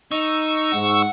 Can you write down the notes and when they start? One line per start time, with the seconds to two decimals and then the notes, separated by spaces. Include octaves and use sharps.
0.11 D#4 C#6 E6
0.73 G#2 F#5